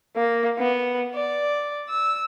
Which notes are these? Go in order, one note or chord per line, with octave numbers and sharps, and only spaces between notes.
A#3
B3
D5
E6